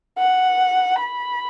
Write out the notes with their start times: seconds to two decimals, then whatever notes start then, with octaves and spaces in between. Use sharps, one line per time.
0.19 F#5
1.03 B5